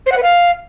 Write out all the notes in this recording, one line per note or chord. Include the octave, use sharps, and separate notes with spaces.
C5
F#5
B4
F5